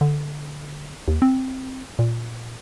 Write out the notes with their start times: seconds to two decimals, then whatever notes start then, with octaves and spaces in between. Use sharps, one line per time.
0.01 D3
1.08 D#2
1.22 C4
1.99 A#2